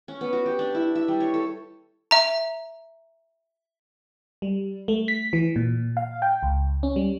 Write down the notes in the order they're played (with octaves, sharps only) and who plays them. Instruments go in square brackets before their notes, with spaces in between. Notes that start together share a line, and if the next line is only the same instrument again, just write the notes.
[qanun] C#4
B3
F#4
G4
D4
E4
E5
G3
C#5
A4
[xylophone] E5 A#5
[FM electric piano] G3
A3
B6
E3
A#2
F5
G5
C#2
C#4
G3